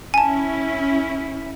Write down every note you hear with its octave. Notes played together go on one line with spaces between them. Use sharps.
C#4 E4 G#5 A5